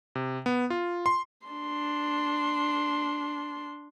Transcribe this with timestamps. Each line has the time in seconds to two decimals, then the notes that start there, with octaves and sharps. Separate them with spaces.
0.15 C3
0.46 B3
0.70 F4
1.06 C6
1.47 D4 C6